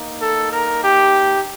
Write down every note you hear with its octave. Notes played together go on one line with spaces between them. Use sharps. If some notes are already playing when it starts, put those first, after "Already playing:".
Already playing: A#3 D#4
A4
A#4
G4